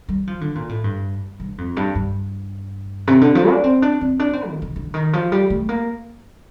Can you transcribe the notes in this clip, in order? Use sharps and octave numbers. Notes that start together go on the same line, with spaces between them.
G3
F3
D3
A#2
A2
G2
G2
F2
G2
G2
C3
D3
F3
D4
C4
D4
C4
D4
C4
D#3
D3
D3
D#3
F3
G3
A3
A#3